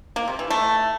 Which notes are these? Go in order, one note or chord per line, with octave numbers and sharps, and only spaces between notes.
A#3
C3
E3
A3